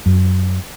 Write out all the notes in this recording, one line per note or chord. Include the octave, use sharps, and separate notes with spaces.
F#2